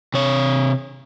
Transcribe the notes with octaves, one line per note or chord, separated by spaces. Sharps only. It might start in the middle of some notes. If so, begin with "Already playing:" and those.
C3 C#5